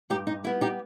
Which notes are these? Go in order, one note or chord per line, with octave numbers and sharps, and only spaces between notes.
G2 D#4 G4
D#4
G3 B3 E4
D#4 G4